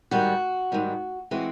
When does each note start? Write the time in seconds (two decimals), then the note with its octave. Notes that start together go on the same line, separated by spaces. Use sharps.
0.11 G#2 D#3 G3 F#4
0.72 G#2 D#3 G3
1.31 E3 G#3 C4 F#4